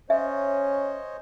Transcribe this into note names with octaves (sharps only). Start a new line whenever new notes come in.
C#4 C5 C#5 D#5 E5